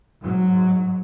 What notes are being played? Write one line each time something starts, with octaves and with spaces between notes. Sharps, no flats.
G#2 F#3